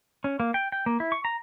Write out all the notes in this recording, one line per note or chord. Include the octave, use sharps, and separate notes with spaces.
C#4
A#3
G5
G5
A#3
E4
C#6
A#5